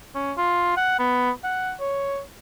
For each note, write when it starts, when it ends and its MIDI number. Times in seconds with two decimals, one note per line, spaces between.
0.15 0.32 61
0.37 0.76 65
0.77 0.97 78
0.99 1.31 59
1.44 1.73 78
1.80 2.20 73